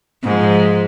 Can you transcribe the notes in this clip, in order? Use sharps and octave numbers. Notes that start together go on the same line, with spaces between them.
G#2 F3